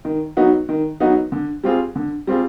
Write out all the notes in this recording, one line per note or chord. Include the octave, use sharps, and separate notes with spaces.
D#3
F#3 B3 D#4 F#4
D#3
F#3 B3 D#4 F#4
D3
G3 C4 F4 G#4
D3
G3 C4 F4 G#4